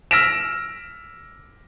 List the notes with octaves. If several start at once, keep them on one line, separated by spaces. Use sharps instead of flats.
E6 F6 A#6 B6 D7 E7